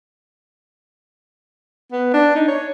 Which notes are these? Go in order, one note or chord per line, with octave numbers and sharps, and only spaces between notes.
B3
D4
D#4
C#5